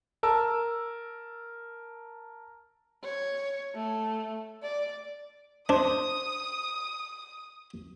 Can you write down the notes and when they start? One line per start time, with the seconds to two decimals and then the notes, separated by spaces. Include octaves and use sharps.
0.23 A#4 A5 E6
3.04 C#5
3.75 A3
4.63 D5
5.69 D4 C5 D#6